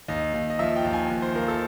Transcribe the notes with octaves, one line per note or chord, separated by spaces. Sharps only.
D#2 D#5
D#2
D#5
F3 E5
G5
D#2
G#5
D#2
C5
F3 A#4
A4